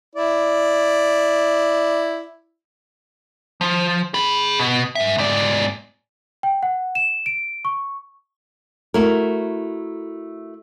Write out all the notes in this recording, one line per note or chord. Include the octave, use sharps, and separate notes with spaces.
E4 D5
F3
G#4 B5
B2
F#2 E5
G#2 D5
G5
F#5
E7
D7
C#6
A3 E4 F#4 A#4